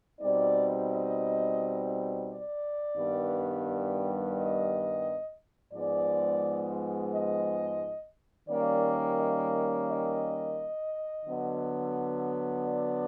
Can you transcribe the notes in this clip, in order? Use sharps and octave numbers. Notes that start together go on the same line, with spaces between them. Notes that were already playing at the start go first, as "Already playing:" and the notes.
B2 G3 C4 D#4 D5
D#5
D5
G2 D#3 G3 B3
D#5
G#2 F3 G#3 B3 D5
D#5
D#3 G3 A#3 C#4 D5
D#5
D#5
D3 F#3 B3
D5